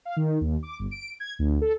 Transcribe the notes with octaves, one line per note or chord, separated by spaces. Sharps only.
F5
D#3
D#2
D6
G1
D7
G#6
D2
A4